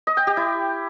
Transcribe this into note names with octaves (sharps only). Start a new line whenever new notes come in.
D#5
G5
G4
E4